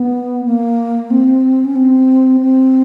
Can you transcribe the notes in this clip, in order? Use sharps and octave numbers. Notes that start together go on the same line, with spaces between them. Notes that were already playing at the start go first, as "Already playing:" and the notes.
Already playing: B3
A#3
C4
C#4
C4
C4